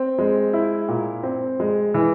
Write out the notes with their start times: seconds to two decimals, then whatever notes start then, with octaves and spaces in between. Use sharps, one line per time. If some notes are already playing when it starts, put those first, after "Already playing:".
Already playing: C4
0.18 G#3
0.53 E4
0.88 A#2
1.23 C4
1.60 G#3
1.94 E3